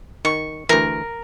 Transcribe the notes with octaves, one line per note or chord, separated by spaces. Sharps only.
D#3 C#6
D2 E3 A#4